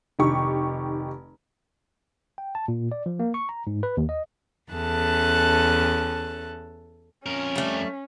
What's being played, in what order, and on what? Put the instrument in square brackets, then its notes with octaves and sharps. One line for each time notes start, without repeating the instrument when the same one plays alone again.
[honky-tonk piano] F1 D#3 G4 C#6
[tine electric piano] G5
A5
A#2
D5
F3
A#3
C#6
A#5
G#2
B4
D#2
D#5
[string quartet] E2 C#4 A4 A5 F#6
[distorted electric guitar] F2 A#4 [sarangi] C#4
[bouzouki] G3 A3